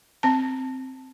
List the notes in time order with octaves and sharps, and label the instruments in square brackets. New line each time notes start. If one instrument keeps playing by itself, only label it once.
[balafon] C4 A5